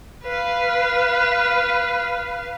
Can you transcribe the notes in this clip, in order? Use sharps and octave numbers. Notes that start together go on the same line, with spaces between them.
B4 F5